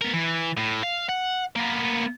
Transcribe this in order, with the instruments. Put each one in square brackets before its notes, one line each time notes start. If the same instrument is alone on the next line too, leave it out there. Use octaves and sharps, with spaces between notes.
[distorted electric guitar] B3 A#4
E3
A2
F5
F#5
A#3 B3